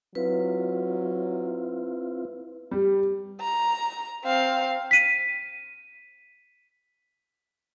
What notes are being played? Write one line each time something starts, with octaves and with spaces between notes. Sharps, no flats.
F#3 C4 E4 F4 B4
G3
A#5
C4 F5
B6 D#7